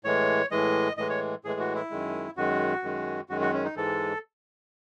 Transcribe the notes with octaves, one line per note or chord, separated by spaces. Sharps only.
A2 E3 G#3 C#5
A2 E3 G#3 D#5
A2 E3 G#3 D#5
C#5
A2 E3 G#3 G#4
F#4
E4
F#2 D#3 G#3
F#2 D#3 G#3 F#4
F#2 D#3 G#3
F#2 D#3 G#3 F#4
F#4
C#4
D#4
G#2 E3 G#3 A4